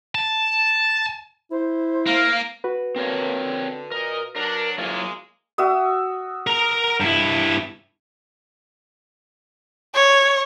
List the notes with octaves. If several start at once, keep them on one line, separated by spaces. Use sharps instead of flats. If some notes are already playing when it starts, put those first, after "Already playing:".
A5
E4 C5
A#3 F5
F#4 B4
D3 A#3 C4 A#4 C#5
D3
A#2 A#4 D#5
F#3 D4 A#4
F#3 G#3 A#3 E4 F4
F#4 E5 D#6
A#4 A#5
G2 E4
C#5